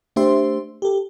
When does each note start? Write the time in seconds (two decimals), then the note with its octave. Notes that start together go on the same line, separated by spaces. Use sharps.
0.16 A3 D4 G4 C5 E5 C6
0.82 G4 A4